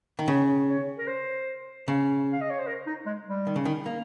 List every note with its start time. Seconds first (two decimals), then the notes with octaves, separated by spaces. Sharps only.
0.19 D#3
0.28 C#3 C#5
0.69 C#5
0.98 A#4
1.07 C5
1.88 C#3
2.32 F5
2.41 D#5
2.50 C#5
2.59 C5
2.67 A#4
2.87 D#4
3.06 G#3
3.27 G3
3.47 D#3
3.56 C#3
3.65 D#3
3.86 A#3